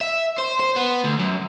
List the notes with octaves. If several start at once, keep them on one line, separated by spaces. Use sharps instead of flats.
E5
C5
C5
B3
D2
F#2